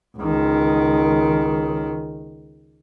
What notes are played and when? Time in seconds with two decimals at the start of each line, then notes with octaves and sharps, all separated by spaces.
0.18 C#2 D#3